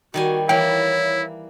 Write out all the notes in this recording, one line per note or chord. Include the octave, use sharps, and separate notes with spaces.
D#3 G3 F#4 G#5
E3 A#3 E4 C#5 G5